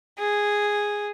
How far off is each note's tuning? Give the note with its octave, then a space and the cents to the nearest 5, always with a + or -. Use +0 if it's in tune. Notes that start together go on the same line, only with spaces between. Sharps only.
G#4 -5